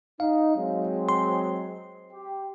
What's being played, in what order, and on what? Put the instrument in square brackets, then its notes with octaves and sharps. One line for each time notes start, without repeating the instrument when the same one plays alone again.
[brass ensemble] D#4 [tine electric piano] F5
[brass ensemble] F#3 G#3 C4
[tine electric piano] C6
[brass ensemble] G4